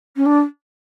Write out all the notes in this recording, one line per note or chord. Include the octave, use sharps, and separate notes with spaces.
C#4
D4